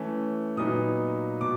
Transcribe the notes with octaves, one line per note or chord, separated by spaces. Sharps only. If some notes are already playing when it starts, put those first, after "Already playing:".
Already playing: E3 A3 C#4
A#2 F#3 B3 D#4 D#6
B2 D6